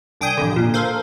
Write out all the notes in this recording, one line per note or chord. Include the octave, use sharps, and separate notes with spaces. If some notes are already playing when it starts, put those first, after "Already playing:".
C2 D4 G5 G#5 D#6 G6
A1 F2 D3
A#2
A4 A#4 C5 F5